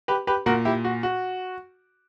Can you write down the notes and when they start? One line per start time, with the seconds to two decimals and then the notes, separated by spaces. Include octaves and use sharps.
0.08 G4 B4
0.27 G4 B4
0.46 A#2 F#4 A#4
0.65 E4 G4
0.85 F#4
1.03 F#4